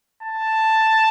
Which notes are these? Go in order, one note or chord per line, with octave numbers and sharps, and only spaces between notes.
A5